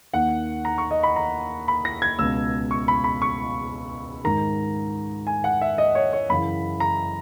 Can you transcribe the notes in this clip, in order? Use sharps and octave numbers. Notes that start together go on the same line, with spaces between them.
D#2 D#3 F#5
A#5
C#6
D#5
B5
A#5
B5
A#6
G#6
C#2 B2 E6
C#6
B5
B5
C#6
G#2 D#3 A#5
G#5
F#5
E5
D#5
C#5
C#5
F#2 C#3 E3 B5
A#5